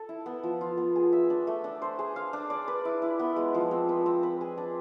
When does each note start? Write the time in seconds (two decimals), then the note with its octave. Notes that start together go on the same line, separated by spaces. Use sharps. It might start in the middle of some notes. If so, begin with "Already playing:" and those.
Already playing: A4
0.09 E4
0.26 B3
0.44 F3
0.61 F4
0.77 B3
0.96 G#4
1.13 E5
1.30 D4
1.47 A3
1.64 D4
1.82 C5
1.99 G#4
2.16 F5
2.33 D4
2.50 D5
2.68 B4
2.85 E4
3.02 E4
3.19 B3
3.36 G#3
3.54 F3
3.71 C4
3.89 B4
4.06 C4
4.23 B4
4.41 G#4
4.57 D4